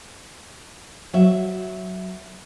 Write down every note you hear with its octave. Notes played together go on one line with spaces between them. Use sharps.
F#3 E5